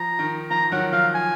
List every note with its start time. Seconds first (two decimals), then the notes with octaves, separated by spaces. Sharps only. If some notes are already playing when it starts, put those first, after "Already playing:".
Already playing: F3 A#5
0.19 D#3
0.51 F3 A#5
0.72 D#3 F#3 F#5
0.92 F3 F5
1.15 G#5